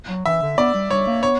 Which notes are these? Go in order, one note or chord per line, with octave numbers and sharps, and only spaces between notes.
F#3
E3 E5
D3
B3 D5
G3
G3 C#5
A#3
B3 C#5